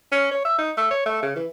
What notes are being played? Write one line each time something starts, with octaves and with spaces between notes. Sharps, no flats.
C#4
C#5
E5
D#4
A3
C#5
A3
C#3
E3